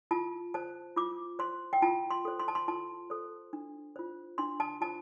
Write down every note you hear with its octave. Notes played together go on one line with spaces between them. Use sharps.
F4 A5
C5 A5
F4 D6
C5 C6
G5
F4 A5
C6
A4 C5
C6
A5
C6
F4 A5
A4 C5
D4
F4 C5
D4 C6
A5
F4 C5 A5